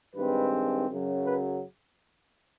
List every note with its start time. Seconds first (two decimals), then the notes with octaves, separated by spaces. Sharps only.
0.15 G2 D#3 G#3 C4 B4
0.88 F#2 C#3 F#3
1.24 B4